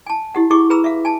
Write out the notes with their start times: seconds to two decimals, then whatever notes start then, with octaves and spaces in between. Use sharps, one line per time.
0.06 G#5 A5
0.35 E4 G4 F#5
0.50 E4 G4 G#4 C#6 D6
0.70 G#4 B4 A#5 B5 E6
0.84 E5 F5
1.05 G#5 A5